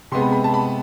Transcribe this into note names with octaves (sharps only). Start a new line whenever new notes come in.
C3 G#3 B3 C6
B5
B5
A5
B5